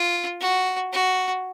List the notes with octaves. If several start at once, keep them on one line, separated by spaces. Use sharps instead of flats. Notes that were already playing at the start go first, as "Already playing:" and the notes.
Already playing: F4
F#4
F#4